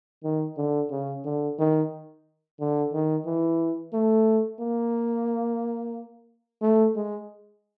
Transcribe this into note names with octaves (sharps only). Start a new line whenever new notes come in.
D#3
D3
C#3
D3
D#3
D3
D#3
E3
A3
A#3
A3
G#3